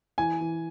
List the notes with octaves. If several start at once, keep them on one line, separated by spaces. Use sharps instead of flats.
E3 G#5
E3